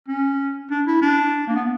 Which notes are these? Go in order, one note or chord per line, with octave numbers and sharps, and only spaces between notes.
C#4
D4
E4
D4
A#3
B3